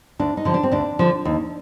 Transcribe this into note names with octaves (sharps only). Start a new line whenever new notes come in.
D2 D4
D#4
D3 F3
D4
C4
D2 D4
D3 F3
D#2